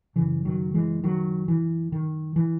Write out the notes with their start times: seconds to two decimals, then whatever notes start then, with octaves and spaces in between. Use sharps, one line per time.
0.16 F#2 C#3 E3
0.45 D#3 F#3
0.74 E3 G#3
1.04 D#3 F#3
1.48 E3
1.92 D#3
2.36 E3